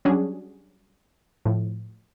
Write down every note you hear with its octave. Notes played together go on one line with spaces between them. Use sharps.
F#3 G3 C#4 D4 F#4 G#4
A2 F3